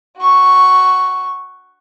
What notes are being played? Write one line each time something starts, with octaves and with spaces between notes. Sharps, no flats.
F#4 C#6